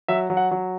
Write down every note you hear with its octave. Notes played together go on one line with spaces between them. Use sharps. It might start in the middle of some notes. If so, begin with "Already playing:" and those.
F#3 E5
F#3
F#5
F#3